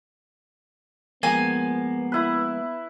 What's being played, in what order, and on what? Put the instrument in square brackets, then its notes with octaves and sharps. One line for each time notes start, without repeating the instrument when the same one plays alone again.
[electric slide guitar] F3 G#3 A#3 [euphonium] B3 [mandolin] G#5
[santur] E4 B4